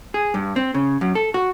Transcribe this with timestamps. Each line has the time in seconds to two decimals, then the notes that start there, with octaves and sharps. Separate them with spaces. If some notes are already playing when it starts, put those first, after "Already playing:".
0.14 G#4
0.34 G2
0.56 C4
0.74 C#3
1.01 F#2
1.15 A4
1.34 F#4